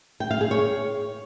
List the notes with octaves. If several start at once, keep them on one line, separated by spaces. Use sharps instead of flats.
G5
F5
G#4
C#5